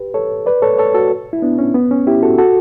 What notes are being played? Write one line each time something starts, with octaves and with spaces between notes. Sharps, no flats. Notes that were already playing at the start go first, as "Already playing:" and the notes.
Already playing: G4 B4
A4 C#5
B4 D5
A4 C#5
A4 C#5
F#4 A4
E4
B3 D4
C#4
B3
C#4
E4 G4
F#4 A4
F#4 A4